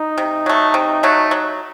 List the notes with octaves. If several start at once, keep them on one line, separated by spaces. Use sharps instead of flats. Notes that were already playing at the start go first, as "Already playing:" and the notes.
Already playing: D#4
C3
F#3 A3
C3
F#3 A3
F#3